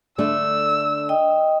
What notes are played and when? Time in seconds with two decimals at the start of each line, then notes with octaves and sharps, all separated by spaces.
0.18 D3 A3 D4 E6
1.09 D#5 G5 D#6